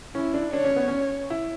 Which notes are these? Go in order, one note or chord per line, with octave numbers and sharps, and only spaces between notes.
C#4 E4
D4
D4 C#5
C#4
B3
C#4
E4